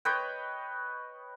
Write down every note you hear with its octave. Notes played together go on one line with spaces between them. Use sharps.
B4 C#5 D#5 G5